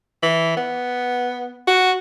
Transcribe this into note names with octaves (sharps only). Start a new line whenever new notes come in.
E3
B3
F#4